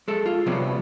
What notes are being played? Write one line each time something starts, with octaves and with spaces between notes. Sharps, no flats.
G#3 A4
F4
C3 F#3 G3 B3 C4